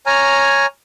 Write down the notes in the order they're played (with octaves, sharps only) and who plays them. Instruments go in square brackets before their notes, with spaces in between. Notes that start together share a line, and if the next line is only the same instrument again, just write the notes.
[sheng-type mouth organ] C#5 G#5 A#5 F6